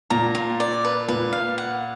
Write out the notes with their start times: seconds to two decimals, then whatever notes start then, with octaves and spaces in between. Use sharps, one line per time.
0.10 A#2 A#5
0.35 F4
0.60 D5
0.85 B4
1.08 A#2 B4
1.33 F5
1.58 F#5